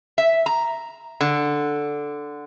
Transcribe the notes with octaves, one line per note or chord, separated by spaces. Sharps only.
E5
A#5
D3